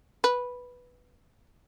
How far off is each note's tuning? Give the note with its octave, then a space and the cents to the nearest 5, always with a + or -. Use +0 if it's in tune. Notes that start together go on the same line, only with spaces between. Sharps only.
B4 -5